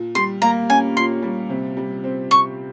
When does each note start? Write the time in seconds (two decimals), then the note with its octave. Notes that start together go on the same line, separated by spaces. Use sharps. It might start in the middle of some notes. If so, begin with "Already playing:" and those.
Already playing: A#2
0.15 G3 C6
0.42 A#3 A#5
0.70 C#4 G#5
0.96 A#2 C6
1.22 G3
1.49 C3
1.77 G3
2.04 C4
2.31 C3 C#6